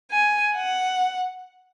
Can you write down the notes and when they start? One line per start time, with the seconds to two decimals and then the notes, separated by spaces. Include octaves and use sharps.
0.11 G#5
0.56 F#5